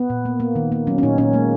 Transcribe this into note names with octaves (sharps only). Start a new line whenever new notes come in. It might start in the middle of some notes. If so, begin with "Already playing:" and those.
Already playing: B3
A#2
A#3
A#3
D#3
A#3
F#3 C#4
C#4
A#2 D#4
A#2 C#4
G#3 A#3